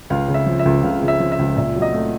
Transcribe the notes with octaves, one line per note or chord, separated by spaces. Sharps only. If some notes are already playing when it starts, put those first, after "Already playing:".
C#2 F5
C#3
E5
F3
E5
C#2
C#2 F5
C#3
E5
F3
E5
C#2
A#2 E5
F#3
D#5
A3